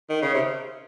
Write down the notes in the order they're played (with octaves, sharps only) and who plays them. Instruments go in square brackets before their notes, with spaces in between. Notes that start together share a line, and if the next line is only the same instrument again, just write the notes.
[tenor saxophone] D#3
C#3
C3